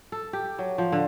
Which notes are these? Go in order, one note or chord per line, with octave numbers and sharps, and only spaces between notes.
A4
G4
F#3
F3
D3